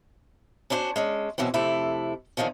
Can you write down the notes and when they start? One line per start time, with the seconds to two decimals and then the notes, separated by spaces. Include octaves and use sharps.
0.70 C#4 D4 E4 F#4 C5
0.96 G#3 C#4 D4
1.38 B2 E3 F#3 C4
1.54 F2 C3 A3 E4
2.37 E2 D3 D#3 F3 C#4